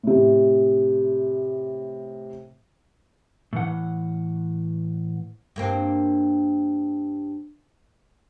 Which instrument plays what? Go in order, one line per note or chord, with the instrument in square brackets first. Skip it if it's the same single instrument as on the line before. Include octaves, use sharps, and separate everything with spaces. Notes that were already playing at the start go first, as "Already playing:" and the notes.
[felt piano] A2 C3
[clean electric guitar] A2 E3 F#5
[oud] G2 A#3 C4